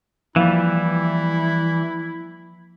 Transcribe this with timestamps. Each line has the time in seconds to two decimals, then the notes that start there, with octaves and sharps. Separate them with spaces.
0.36 E3 F3 G3 A#3 E4 F5